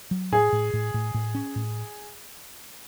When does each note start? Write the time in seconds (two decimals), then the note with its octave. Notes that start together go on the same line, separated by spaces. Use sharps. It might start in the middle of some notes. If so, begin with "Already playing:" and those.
0.11 F#3
0.32 A2 G#4
0.52 A2
0.73 A2
0.94 A2
1.14 A2
1.35 C#4
1.56 A2